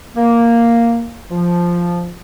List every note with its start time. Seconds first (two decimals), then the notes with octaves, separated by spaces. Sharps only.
0.16 A#3
1.30 F3